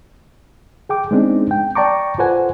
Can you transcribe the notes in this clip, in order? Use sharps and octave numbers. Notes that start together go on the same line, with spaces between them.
G#4 G5 D6
G#3 B3 C4 D4 D#4 G#4
G5
D5 G5 A5 A#5 C#6 D6
F4 A4 B4 C5 F#5 G#5